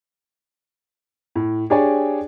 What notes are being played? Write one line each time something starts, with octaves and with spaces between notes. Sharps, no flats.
A2
D4 G4 G#4 C#5 D5 G#5